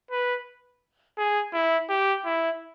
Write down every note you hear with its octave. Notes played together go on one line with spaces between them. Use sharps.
B4
G#4
E4
G4
E4